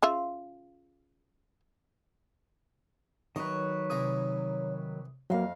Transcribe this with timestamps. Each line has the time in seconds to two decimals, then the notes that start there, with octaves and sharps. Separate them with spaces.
0.02 C#3 F4 E5
3.36 D#3 F#3 B4 C#5 D#5
3.90 C2 E3 A#5 D#6
5.30 F2 F#3 A#3 F5